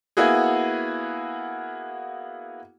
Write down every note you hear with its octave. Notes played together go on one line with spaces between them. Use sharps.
A#3 B3 E4 F#4 G#4